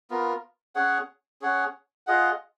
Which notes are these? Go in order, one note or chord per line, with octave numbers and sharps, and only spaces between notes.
B3 F4 A#4
C#4 G#4 C#5 F#5
C#4 G#4 C#5 F#5
F4 G#4 D#5 F#5